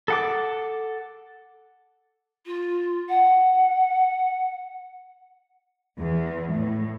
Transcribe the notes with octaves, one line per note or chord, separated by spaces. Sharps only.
A4 F#5 D6
F4
F#5
E2
A2